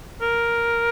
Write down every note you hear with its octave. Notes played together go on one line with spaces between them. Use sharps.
A#4